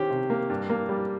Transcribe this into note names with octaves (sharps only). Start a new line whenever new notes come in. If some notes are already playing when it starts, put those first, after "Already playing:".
Already playing: D#3 C#4 G4 C5
C3
A#3
G2
A#3
G3